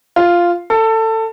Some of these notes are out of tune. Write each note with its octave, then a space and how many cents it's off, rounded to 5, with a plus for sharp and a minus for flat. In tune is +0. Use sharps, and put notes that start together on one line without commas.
F4 -5
A4 +20